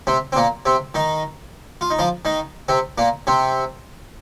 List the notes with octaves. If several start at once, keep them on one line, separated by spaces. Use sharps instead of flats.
C3 C4
C4
A#2 A#3
C3 C4
D#3 D#4
F4
D#4
F3 F4
D#3 D#4
C3 C4
A#2 A#3
C3 C4